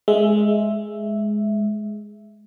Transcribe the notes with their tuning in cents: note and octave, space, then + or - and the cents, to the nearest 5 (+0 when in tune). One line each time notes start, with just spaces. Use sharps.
G#3 +10 E5 +0